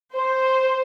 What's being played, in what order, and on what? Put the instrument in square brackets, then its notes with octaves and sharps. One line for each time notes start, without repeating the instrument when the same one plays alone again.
[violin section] C5